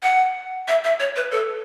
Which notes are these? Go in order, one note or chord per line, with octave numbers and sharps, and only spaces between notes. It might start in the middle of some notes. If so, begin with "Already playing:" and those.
F#5
E5
E5
C#5
B4
A4